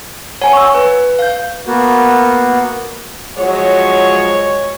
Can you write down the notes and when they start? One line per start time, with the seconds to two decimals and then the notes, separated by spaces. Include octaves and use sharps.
0.42 C#5 F#5 G#5
0.53 C#6 E6
0.75 B4
1.19 F5 G6
1.67 A#3 B3 F#4
3.36 F3 F#3 G#3 C#5 F#5